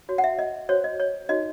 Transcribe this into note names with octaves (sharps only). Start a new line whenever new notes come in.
F#4 C#5
F#5
E5
D#5
F#4 C5 C#5
D#5
C#5
D#4 F#4 C#5 D#5